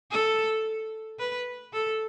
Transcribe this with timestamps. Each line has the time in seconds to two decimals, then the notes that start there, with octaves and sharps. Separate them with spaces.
0.12 A4
1.19 B4
1.73 A4